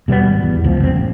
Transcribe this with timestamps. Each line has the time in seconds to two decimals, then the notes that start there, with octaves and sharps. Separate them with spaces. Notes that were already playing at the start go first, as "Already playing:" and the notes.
0.08 B2 G3 G#3 B3
0.28 G#1
0.43 E2
0.64 C#2 F3
0.80 F#1 C4
0.96 A1